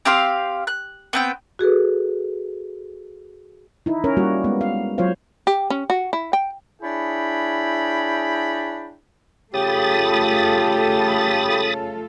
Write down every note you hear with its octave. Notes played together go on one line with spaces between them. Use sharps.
C4 G4 F5 C6
F#6
B3 C4 G5
F#4 G#4 A4 B4
D#4 E4
C#4 A#4 C#5
G3 A#3 F#4
G#3 B3
F5
F#3 F4 C5 C#5 F5
G4
C#4
F#4
E4
G5
D4 E4 G#4 C#5 G5 B5
C#3 A3 F4 G4 A4 B5 D#6 A6